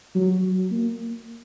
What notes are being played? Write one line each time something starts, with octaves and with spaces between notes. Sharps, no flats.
F#3
A#3